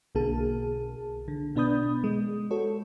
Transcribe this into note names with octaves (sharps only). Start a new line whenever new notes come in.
B1 B2 D3 A#3 G#4 A5
D3
B2 B3 D4 B5 D#6 G6
G#3
F#4 A4 C#5